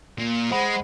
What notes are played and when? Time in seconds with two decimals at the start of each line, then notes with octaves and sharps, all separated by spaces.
0.19 A#2
0.51 G#3 C5 F#5 B5